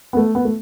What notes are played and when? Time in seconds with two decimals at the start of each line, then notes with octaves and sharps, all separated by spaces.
0.13 B3
0.17 A3
0.35 B3
0.45 A3